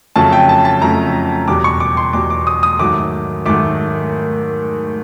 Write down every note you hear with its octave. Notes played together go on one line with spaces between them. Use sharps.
F2 C#3 F#3 A3 A5
G5
A5
A5
F2 C#3 F#3 A3 A#5
E2 B2 G3 D6
C#6
D6
C6
E2 B2 G3 D6
D6
D#6
D#6
G#2 D#3 F#3 A3 D6
G#2 D#3 F#3 A3 D6